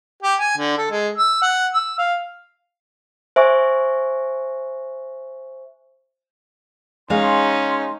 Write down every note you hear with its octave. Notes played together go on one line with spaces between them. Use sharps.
G4
G#5
D3
A4
G#3
E6
F#5
E6
F5
C5 E5 G#5 C#6
G#3 C#4 D#4 F5 C6